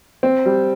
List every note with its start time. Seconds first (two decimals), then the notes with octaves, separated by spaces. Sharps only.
0.23 C4
0.46 G3